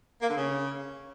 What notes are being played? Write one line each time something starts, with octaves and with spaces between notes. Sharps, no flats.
A#3
D3
C#3